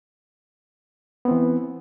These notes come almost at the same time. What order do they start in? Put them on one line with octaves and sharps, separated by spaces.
B3 C4 E3